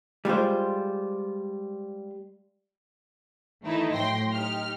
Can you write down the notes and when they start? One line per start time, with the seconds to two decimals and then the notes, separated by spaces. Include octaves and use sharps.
0.25 G3 G#3 F4 C5
3.63 D#3 E3 A3 D#4 E4
3.93 A2 F#3 G5 C6 A#6
4.33 D#4 G4 F6